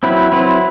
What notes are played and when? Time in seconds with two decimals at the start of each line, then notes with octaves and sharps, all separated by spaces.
0.03 F#3 C4 E4 B4
0.32 F#3 C4 E4 B4